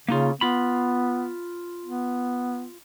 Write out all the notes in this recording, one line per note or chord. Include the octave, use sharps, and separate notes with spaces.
C#3 A#3 D#4 F4
B3 F4 B5
B3